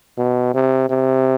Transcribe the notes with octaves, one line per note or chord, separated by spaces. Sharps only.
B2
C3
C3